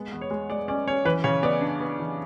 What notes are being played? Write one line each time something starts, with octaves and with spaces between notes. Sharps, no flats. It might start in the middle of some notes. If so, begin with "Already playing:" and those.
Already playing: G#3 B3
E2
C#5
G#3
G#3 D5
C#4 D5
C#4 C#5
E3 B4
C#3 C#5
B3 D5
D4
B3
E3